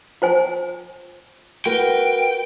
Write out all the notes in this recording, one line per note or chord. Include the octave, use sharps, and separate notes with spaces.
F4 C5 G#5
F#4 A#4 B4 G5